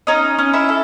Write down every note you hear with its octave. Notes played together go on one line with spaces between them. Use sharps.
C#4 D#4 D#5
C#4
E4 E5
A4